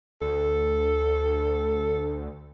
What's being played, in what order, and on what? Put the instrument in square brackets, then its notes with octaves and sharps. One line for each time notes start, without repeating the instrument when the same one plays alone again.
[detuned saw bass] D2 [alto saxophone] A4